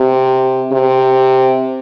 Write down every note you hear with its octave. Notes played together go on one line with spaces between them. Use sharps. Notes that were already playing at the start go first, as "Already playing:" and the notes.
Already playing: C3
C3